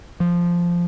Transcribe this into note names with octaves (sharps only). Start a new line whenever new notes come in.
F3